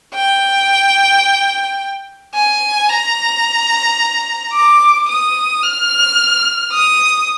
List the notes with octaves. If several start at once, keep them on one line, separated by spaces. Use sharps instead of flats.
G5
G#5
A#5
D6
D#6
F6
D#6